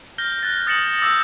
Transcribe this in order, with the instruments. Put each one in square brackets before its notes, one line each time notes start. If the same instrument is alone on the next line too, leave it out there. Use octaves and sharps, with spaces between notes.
[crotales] F6 G6 A#6 G7
F#6 A6
D#6 A6 A#6 C#7 E7 F#7
D6 E6 G6 A6